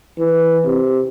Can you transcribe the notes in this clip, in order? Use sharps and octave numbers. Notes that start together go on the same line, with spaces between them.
E3
C3